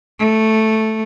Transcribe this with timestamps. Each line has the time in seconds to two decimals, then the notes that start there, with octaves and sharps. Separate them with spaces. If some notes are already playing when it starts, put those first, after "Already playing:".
0.19 A3